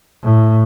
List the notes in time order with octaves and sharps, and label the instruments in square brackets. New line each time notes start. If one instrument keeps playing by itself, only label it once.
[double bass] A2